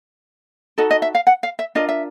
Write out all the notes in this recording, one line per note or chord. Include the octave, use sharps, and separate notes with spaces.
D#4 F#4 A4 D#5
D#5
E5
F5
F#5
F5
E5
D4 F4 A#4 D#5
E5